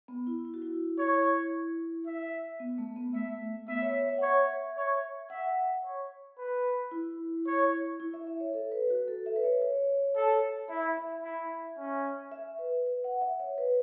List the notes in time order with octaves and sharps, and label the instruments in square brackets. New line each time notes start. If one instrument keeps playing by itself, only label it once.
[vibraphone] B3
E4
E4
F#4
E4
[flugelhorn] C#5
E5
[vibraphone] B3
A3
B3
[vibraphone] A3 [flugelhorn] E5
[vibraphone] B3 [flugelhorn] E5
[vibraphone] C#5
E5
C#5
F#5
[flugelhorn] C#5 [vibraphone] E5
[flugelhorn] C#5
[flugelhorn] E5 [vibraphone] F#5
[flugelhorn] C#5
B4
[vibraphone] E4
[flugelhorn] C#5
[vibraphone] E4
E5
E5
C#5
A4
B4
F#4
A4
E5
B4
C#5
C#5
[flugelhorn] A4
[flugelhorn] E4 [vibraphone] E5
[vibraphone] E5
[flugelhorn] E4
C#4
[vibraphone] E5
B4
B4
F#5
E5
C#5
B4